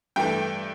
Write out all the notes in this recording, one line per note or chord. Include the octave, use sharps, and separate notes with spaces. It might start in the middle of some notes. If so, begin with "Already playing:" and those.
G2 E3 A3 G5